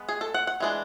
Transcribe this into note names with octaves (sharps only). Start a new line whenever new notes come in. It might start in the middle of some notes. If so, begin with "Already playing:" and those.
Already playing: G#3 B3
G#4
A4
F#5
F#5
E3 G#3 D4